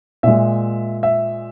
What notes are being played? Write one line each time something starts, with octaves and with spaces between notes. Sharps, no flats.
A#2 G#3 E5
E5